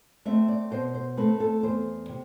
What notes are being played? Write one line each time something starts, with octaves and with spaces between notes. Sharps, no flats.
A3 C4 E5
D5
B2 C5
C5
A3 C4 B4
A4
E2 C5
C3